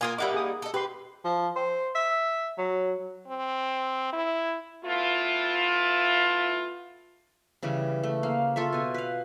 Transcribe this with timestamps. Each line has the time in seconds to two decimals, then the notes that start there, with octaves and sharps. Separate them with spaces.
0.01 A#3 F4 A#4 G#5 D#6
0.18 G3 A#3 D#4 E5 F#5 D6
0.34 G#4 D#6
0.62 A4 D#5
0.74 G4 B4 C6
1.25 F3
1.56 C5
1.95 E5
2.58 F#3
3.28 C4
4.13 E4
4.84 A3 B3 E4 F4
7.63 C#3 E3 G3 C#5
8.04 A3
8.23 A#3 F5
8.56 F4 A4 C#5 E5
8.72 B2 G#5
8.94 B4 F5